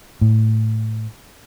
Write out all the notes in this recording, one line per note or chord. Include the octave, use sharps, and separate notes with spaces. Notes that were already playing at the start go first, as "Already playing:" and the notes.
A2